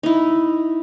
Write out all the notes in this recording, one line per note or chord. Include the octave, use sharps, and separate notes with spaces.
D#4 E4